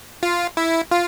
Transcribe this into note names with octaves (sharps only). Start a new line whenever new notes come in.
F4
E4
F4